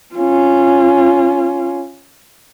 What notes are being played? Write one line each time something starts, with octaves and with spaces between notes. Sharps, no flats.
C#4 F4